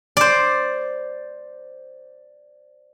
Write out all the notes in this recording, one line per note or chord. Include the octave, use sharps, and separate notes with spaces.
C5 D5